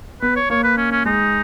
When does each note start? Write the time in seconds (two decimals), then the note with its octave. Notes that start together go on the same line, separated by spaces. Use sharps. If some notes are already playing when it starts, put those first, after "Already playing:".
0.22 B3 B4
0.36 C#5
0.50 A#3 C#5
0.64 B4
0.78 C#4
0.91 C#4
1.05 G#3 D#4